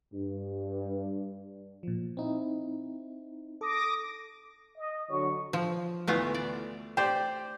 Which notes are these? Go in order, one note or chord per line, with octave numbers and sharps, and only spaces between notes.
G2
A#2 F3
C4 D#4 E4
A4 D6 D#6 A#6
D#5
D3 F#3 C#5 C#6
F3
D2 E3 A3 B3 F4
D5
G4 C5 D5